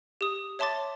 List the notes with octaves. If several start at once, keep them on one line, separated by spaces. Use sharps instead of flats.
G4 D#6
C#5 E5 A5 C6 D6 A6